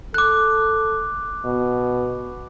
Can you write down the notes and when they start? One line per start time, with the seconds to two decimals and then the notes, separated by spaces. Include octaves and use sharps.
0.14 A4 D6 F#6
1.45 B2